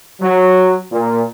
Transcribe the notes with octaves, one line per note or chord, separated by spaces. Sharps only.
F#3
A#2